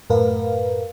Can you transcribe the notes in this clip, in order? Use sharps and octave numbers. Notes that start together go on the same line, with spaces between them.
F#2 A2 A#4 B4 F5